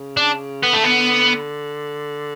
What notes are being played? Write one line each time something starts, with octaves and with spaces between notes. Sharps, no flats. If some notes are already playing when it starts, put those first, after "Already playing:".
Already playing: C#3
D4
D3 B3
A3
B3